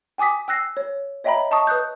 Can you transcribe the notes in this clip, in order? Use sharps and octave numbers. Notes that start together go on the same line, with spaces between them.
G5 G#5 D6 D#6 B6
G5 E6 F#6 A#6 C7
C#5
C#5 D#5 E5 G5 A#5 B5
D#5 A5 C#6 D#6
B4 D#6 F#6 G6